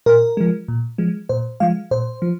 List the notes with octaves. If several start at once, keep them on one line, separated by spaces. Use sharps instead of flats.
A#2 A#4
F3 G#3
A#2
F3 G#3
A#2 C5
F3 G#3 F5
A#2 C5
F3